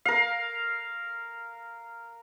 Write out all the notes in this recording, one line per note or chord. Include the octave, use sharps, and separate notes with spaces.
A#4 F5